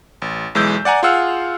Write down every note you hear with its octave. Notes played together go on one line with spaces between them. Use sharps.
A1
B1 E3 G#3 E6 G6
D5 F#5 G#5 A#5
F4 G#4 F5 F#5 E6 F6